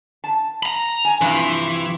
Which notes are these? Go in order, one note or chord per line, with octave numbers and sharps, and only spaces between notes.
A5
A#5 B5
G#5
G2 C3 E3 F3